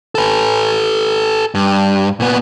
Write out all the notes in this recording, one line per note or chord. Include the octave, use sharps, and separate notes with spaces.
A4 B4
G2
A#2 B3